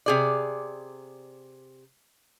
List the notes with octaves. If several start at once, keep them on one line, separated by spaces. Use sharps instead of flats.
C3 G#4 D5